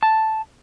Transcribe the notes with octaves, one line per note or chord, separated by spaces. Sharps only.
A5